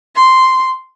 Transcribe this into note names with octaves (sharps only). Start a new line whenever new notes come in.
C6